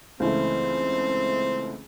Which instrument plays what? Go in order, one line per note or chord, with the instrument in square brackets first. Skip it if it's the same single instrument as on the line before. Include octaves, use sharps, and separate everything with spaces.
[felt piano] C#2 E3 A3 [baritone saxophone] C4